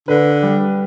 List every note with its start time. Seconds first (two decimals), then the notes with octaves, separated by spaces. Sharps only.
0.08 D3 B4
0.43 G3